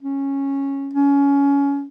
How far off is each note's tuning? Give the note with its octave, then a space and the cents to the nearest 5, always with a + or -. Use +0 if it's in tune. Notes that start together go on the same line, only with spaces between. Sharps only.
C#4 -10
C#4 +20